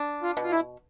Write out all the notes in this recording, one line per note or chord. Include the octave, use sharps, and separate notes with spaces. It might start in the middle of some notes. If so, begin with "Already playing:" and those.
Already playing: D4
F4
B2
F4
E4